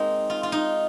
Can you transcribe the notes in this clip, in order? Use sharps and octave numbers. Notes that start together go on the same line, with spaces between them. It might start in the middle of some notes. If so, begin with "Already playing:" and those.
Already playing: G#3 A#3 C4 D#4
F4
F4
D#4